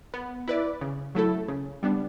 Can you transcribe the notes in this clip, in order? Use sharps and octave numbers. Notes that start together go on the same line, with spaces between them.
B3
E4 B4 D5
C#3
F#3 A3 E4 A4
C#3
G3 B3 D4